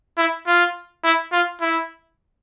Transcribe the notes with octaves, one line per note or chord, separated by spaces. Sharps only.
E4
F4
E4
F4
E4